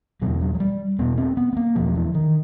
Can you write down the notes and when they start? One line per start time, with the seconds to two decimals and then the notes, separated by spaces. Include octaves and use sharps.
0.22 E2 B2 F#3
0.41 F#3
0.55 F#3
0.60 G3
0.99 E2 B2 B3
1.18 C4
1.37 B3
1.53 B3
1.57 A#3
1.75 E2 B2 F3
1.95 E3
2.14 D#3